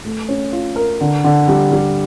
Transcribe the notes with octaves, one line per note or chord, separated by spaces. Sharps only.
A3
C#4
F4
A#4
D3
D3
G3
G3